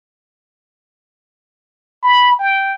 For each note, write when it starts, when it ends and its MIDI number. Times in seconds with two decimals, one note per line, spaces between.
2.03 2.38 83
2.39 2.75 79